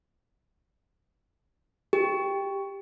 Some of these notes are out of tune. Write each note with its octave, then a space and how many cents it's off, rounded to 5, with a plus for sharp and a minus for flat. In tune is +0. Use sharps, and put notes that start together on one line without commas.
G4 +10